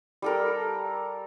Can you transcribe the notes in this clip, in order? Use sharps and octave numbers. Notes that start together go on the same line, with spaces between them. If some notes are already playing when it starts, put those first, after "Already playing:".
G3 A4 A#4